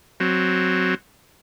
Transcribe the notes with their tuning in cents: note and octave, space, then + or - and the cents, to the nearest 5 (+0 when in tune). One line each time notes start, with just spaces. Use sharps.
F#3 +0 C4 +0